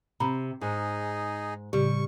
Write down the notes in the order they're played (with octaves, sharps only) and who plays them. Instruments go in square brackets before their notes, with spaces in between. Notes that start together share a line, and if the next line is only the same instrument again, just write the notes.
[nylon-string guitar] C3 [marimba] A#5 B5
[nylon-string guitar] G#2 [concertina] D#4 G#4
[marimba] A2 C#3 G4 [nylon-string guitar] G3 [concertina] C#6